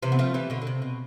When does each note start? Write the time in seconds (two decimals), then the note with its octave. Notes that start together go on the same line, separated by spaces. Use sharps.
0.03 C3 E3
0.12 B3
0.19 F3 A3
0.34 E3 G3
0.50 B2 D3
0.62 D3
0.67 C3
0.82 B2